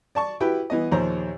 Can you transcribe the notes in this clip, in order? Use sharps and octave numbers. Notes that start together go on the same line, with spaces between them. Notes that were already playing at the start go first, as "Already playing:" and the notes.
D5 A5 C#6
E4 F#4 G4 B4 G5
E3 B3 D#5
A#1 D#2 C5 C#5 A#5